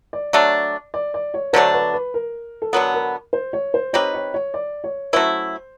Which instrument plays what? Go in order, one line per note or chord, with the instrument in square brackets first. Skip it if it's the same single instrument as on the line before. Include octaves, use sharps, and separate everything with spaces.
[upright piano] D5
[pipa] F#3 A3 D4
[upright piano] D5
D5
C#5
[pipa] D3 F#3 A3 D4 [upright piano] C5
[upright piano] B4
B4
A#4
A4
[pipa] D3 F#3 B3 [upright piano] A#4
[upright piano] A#4
C5
C#5
C5
[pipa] C4 D#4 G4 B4 [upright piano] C#5
[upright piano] C#5
C#5
D5
C#5
[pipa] F#3 A3 C#4 E4 [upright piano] C5